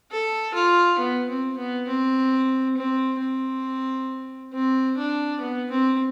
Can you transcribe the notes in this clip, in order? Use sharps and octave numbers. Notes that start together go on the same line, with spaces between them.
A4
F4
B3
C4
B3
C4
C4
C4
C4
D4
B3
C4